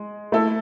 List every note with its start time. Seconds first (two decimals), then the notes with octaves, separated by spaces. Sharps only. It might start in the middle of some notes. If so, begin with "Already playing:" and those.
Already playing: G#3
0.32 A3 E4 A4